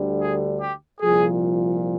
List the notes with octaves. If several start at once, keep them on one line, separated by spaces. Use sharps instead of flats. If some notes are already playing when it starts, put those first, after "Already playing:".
Already playing: D2 D3 G3
G#4
G4
C2 A#2 F3 G#4